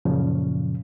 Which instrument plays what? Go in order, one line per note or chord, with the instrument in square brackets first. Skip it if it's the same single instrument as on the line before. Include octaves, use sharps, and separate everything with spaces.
[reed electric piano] F#2 A#2 C#3 F3